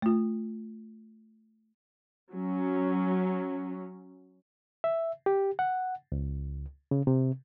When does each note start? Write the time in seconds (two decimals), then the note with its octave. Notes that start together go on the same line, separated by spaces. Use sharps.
0.02 A3 F4
2.34 F#3 C#4
4.84 E5
5.26 G4
5.59 F#5
6.12 C#2
6.91 C#3
7.07 C3